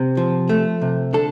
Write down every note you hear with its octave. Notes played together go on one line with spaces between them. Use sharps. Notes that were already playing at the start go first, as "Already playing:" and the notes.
Already playing: C3
F3
A3
C3
D3 A4